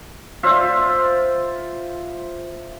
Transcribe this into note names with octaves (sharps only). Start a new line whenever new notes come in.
F4 C5 E5 F5